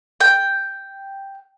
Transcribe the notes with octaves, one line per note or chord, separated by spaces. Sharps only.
G5